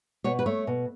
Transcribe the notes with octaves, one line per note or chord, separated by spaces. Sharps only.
B2 C#5
B4
A3 C#5
B2